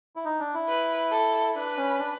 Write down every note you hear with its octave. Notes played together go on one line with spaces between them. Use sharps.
E4
D#4
D4
E4
B4
A4
D4 B4
C#4
D4